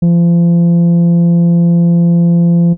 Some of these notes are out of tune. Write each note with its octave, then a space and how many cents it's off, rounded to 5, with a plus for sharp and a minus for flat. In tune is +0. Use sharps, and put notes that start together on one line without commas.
F3 -35